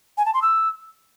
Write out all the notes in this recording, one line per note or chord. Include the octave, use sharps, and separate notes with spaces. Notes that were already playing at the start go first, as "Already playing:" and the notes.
G#5
A5
C6
E6